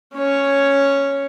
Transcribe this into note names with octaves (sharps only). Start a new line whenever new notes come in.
C#4 C#5